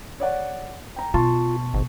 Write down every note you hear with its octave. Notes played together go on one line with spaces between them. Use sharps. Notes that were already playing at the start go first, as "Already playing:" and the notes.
C#5 D5 F#5
G5 A#5
B2 F4 A5 C6 C#6
G#1